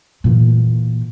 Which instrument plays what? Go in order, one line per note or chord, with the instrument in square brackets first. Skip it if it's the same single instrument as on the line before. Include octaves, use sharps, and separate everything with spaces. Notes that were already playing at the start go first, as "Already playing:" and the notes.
[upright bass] A#2 E3